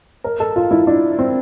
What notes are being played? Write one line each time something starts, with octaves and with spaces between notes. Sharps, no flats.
A#4
A4
F4
E4
D4
C4